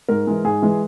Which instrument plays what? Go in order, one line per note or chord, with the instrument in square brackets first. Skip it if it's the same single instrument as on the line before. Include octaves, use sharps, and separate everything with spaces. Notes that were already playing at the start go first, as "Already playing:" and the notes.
[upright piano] G#2 A#4
E3 G#3
G#2 G#4
E3 G#3